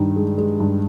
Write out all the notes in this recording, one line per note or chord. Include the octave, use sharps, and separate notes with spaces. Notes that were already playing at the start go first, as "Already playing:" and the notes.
Already playing: G2 D#3
G#3
G#3
G2